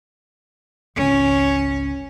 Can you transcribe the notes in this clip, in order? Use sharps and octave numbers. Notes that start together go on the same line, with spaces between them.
G#1 C#2 C#4